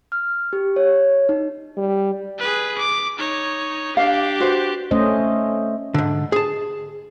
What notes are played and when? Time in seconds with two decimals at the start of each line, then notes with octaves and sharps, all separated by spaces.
0.12 F6
0.53 G4
0.76 C#5
1.29 D#4
1.77 G3
2.39 G#4 B4
2.78 D6
3.19 D#4 C#5
3.97 D4 G4 F5
4.40 F#4 B4 C5
4.91 A3 C#4 C5 D#5
5.94 G#2 D3
6.32 G#4 A5